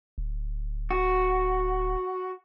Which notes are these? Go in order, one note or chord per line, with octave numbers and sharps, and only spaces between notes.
D1
F#4